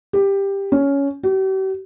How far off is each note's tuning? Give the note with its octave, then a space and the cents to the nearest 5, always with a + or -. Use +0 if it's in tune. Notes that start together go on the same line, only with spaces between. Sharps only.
G4 +10
C#4 +10
G4 -45